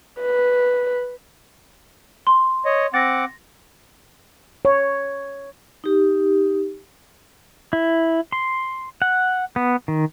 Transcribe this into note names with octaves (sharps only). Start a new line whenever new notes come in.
B4
C6
C#5 D#5
C4 F#5 D6 A6 A#6
C#5
D#4 G4
E4
C6
F#5
B3
D#3